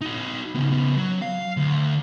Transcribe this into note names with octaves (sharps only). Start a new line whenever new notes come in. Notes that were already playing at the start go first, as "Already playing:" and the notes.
D#4 F#4
C#3 B3
C#3 B3
F#3
F5
D2